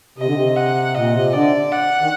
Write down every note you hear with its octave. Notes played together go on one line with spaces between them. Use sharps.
C3 D#5
D3
C3
F#5
A#2 D#5
C3
D3 D5
F#5
D#3